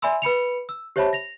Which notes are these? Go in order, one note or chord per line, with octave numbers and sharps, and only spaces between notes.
D5 E5 G#5 B5 C6 E6
B4 B5 C#7 F7
E6
G4 C5 C#5 E5 A5 B5
A#6 F7